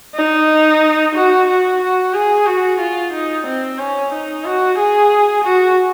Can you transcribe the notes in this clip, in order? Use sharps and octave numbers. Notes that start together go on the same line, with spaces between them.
D#4
F#4
F#4
F#4
G#4
F#4
F4
D#4
C4
C#4
D#4
F#4
G#4
F#4